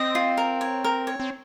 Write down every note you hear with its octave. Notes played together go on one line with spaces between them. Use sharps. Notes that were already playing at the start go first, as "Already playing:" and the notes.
Already playing: C4 D#5
F4
A#4
C#5
A#4
C#5
C4